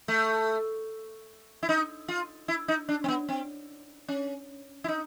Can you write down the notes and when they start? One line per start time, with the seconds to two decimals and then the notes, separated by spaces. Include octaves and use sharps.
0.08 A3
1.63 E4
1.69 D#4
2.08 F4
2.48 E4
2.68 D#4
2.89 D4
3.04 C4
3.08 B3
3.29 C4
4.08 C#4
4.84 E4
4.88 D#4